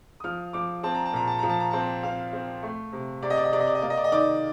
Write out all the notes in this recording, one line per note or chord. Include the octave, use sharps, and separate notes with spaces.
D#6
F3 F6
F3 D6
C4 A5
A#5
A5
A#2 A#5
A5
F3 A#5
A5
A#5
C4 A5
C4 F5
C4
A3
C3
C3 D5
D#5
D5
D#5
C3 D5
D#5
D5
D#5
A#3 D5
D#5
D5
D#5
D#3 D5